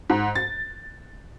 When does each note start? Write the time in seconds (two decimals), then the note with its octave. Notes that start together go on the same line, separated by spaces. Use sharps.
0.10 G#2
0.35 A6